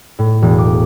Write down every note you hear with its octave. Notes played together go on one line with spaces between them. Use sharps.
A2
E1
D6